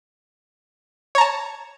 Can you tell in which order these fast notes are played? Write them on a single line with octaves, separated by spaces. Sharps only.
C#5 A#5 A5